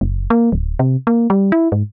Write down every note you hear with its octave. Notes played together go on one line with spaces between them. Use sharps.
F#1
A#3
D1
C3
A#3
G3
E4
G#2